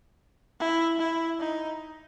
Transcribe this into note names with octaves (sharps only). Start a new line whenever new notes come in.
E4
E4
D#4